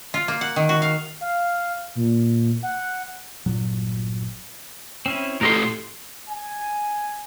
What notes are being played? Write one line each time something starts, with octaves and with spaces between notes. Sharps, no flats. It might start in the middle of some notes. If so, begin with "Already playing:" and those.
F4
A#3
F#5
D#3
F#4
F5
F5
A#2
F#5
G1 A#2 F#3
C4 C#4 E4
A2 G4 A4 A#4 D#5 C6
C6
G#5